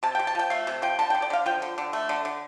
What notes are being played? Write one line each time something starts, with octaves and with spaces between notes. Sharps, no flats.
C3 A5
C3 G5
A5
F3 G5
A3 F5
C3
F3 G5
D3 A5
D3 G5
D5
D3 F5
F3 G5
D3
D3
A3
D3
D3